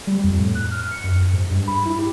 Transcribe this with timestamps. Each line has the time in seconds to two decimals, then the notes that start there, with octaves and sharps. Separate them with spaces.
0.07 G3
0.24 F2
0.39 A2
0.55 F#6
0.71 F6
0.91 C#7
1.04 F#2
1.33 G#2
1.51 G2
1.68 B5
1.85 E4
1.99 G4